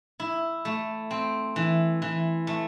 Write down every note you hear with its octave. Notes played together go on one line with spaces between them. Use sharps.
E4
A3
C4
E3
E3
A3